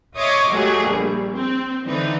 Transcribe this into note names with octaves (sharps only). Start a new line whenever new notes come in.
C#5 D#5 E5 C6 D6 D#6
F#3 G#3 A3 G4 G#4
A#1 G3
C4
D3 E3 C4 D#4 B4